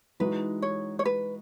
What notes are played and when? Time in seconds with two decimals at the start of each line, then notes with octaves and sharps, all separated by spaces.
0.20 E3 G#3 D#4 F#4 B4
0.62 C#5
0.99 C#5
1.05 B4